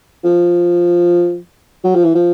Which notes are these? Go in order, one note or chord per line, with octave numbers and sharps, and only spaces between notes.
F3
F#3
F3
E3
F3